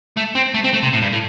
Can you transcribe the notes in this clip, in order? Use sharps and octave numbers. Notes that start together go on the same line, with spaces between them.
A3
C4
A3
C4
A3
C3
A2
G2
A2